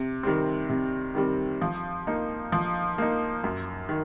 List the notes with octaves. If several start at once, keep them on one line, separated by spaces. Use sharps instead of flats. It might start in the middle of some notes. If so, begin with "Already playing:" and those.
Already playing: C3
D#3 G3 C4
C3
D#3 G3 C4
F3
A#3 D#4
F3
A#3 D#4
F#2
D#3